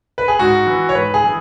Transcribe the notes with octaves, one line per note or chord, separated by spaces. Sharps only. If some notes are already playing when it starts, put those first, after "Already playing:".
B4
G#4
G#2 F#4
E3
C#5
G#2 B4
G#4
E3